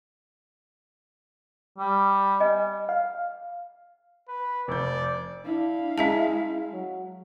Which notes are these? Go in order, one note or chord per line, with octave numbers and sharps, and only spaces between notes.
G3
D#5 G#5
F5
B4
F1 D5 G6
D4 E4 F5
G#3 C#4 E5 A5
G#3
F#3